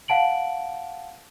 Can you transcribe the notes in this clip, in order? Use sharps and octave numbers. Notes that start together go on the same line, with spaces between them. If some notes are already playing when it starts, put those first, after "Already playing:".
F5 F#5 A5 D7 F#7